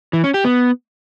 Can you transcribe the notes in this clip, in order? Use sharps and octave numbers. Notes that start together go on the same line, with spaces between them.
E3
C#4
G4
B3